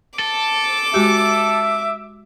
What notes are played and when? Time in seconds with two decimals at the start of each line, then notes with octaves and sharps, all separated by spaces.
0.19 A4 D6
0.94 G#3 F#4 G4 E5